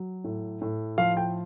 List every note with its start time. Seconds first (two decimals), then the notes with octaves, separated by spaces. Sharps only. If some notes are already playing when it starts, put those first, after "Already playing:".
Already playing: F#3
0.24 A2
0.61 A2
0.98 F3 F5
1.17 G5